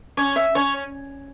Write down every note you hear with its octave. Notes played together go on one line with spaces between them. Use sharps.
C#4 C#5
E5
C#4 C#5